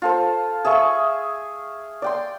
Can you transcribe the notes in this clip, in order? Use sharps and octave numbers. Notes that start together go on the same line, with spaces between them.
F4 A4 C5
G#4 E5 F5 C#6
D5 G5 C6